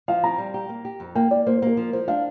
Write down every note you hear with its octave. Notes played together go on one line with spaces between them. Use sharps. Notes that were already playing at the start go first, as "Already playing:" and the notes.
F3 F5
C4 A#5
G3
G4
A#3
G4
F2
A#3 G5
A#3 D5
A#3 C5
C5
A#3 A#4
F3
F3 C5
D4 F5